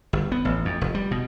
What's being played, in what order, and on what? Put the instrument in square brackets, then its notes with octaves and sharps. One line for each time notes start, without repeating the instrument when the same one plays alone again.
[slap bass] G1
B3
A1
F2
F1
G3
B2